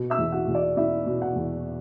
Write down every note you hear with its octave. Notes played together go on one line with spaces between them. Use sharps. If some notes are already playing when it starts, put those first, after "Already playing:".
Already playing: B2
E5 E6
E2
F#4 F#5
E2
D5
B2 E4 E5
B2
F#4 F#5
E2